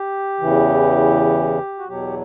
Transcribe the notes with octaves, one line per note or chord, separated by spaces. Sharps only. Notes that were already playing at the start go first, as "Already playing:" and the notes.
Already playing: G4
E2 C#3 E3
F#4
E2 B2 F#3 G4